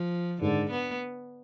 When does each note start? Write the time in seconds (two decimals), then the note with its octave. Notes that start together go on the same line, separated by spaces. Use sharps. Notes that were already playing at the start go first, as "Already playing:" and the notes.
Already playing: F3
0.41 G#2 D3 D#3 G#3
0.70 B3